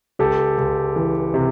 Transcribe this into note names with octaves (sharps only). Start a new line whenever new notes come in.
C#2 G4 A4
C#2
E3
C3